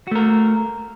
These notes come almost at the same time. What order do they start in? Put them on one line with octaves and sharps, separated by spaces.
F#4 A3 A#4